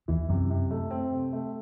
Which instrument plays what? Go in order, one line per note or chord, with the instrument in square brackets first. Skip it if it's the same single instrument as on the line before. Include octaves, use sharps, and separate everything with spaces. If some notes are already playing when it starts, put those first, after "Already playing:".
[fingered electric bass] E2 [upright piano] E3
[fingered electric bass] F#2 [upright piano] C3
[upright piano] C3
A3
C4
C3
A3